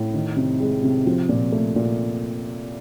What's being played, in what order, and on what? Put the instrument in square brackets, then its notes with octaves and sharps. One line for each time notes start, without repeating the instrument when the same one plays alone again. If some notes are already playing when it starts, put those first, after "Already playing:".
Already playing: [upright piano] A2
D#3
C3
G#3
C3
F3
A#2
A3
A#2